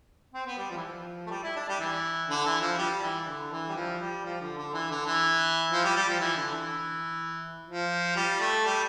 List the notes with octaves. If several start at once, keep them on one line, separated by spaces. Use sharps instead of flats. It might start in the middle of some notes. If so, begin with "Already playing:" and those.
C4
B3
G3
F3
E3
F3
A3
G3
E4
D4
G3
E3
D3
E3
F3
G3
E3
D3
E3
G3
F3
G3
F3
D3
D3
E3
D3
E3
F3
G3
G3
F3
E3
D3
E3
F3
G3
A3
G3